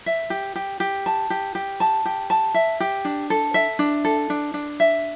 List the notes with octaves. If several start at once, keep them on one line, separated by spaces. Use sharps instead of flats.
E5
G4
G4
G4
A5
G4
G4
A5
G4
A5
E5
G4
D4
A4
E5
D4
A4
D4
D4
E5